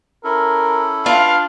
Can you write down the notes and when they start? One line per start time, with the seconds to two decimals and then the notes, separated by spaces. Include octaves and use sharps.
0.24 C#4 E4 A4 A#4
1.06 D4 F4 B4 F5